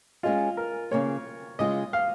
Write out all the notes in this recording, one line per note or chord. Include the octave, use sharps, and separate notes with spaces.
G#3 C#4 F4 G#4 D#5
A#4
C#3 A#3 F4 C#5
C#3 G#3 F4 D#5
F5